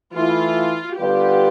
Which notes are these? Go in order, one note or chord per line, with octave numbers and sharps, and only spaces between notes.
E3 A3 E4 F4
D3 G3 B3 F4 G4 B4